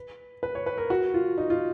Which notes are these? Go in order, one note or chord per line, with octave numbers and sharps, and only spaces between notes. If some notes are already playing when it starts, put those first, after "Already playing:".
Already playing: B4
B4
C#5
B4
A#4
F#4
F4
D#4
F4